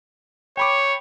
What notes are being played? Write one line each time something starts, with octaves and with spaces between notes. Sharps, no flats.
C#5 G5 B5 D6